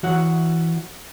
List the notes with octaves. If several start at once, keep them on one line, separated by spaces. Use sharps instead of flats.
E3 F#4 C#5 F#5